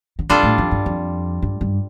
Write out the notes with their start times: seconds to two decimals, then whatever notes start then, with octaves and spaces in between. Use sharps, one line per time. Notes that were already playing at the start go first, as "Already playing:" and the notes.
0.19 D3
0.29 C3 G3 D4 F4 A4
0.43 A2
0.58 F2
0.71 G2
0.86 F2
1.42 G2
1.61 G2